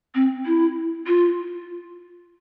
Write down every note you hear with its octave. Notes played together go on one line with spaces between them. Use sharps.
C4
E4
F4